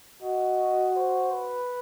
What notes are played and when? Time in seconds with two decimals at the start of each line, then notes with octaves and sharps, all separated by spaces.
0.23 F#4 D#5
0.96 C5
1.33 B4